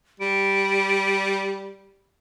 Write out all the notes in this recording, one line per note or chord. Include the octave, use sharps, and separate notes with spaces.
G3 D7